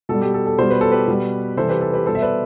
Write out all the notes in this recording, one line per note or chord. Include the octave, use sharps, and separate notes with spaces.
B2 G3 A4
G4
A4
A4
B2 G3 C5
B4
A4
G4 B4
B2 G3
C3 E3 G3 A4 C5
G4 B4
A4
G4 B4
B2 G3 A4 C5
E5
B4 D5